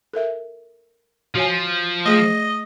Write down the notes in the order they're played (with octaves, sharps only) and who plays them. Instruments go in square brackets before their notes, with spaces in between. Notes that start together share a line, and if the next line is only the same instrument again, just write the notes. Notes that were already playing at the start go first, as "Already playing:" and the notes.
[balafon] A4 A#4 E5
[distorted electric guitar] F3 [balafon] F#4 C#5 G#5
[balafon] A3 G#4 [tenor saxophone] D#5